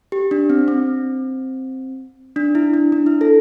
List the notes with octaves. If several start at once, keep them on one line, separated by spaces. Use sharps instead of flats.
G4
D4
C4
C4
D4
E4
D4
D4
E4
A4